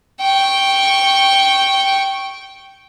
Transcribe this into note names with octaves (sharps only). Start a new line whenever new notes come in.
G5 C#6